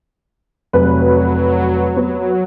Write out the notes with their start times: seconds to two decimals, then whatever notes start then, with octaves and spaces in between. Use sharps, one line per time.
0.73 F1 F#3 B4
1.97 B3